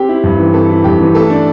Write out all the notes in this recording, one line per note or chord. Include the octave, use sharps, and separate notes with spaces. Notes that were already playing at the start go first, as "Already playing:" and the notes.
Already playing: C4 G4
E4
G2
E3
C4 A4
E4
G2 G4
E3
A3 A4
D4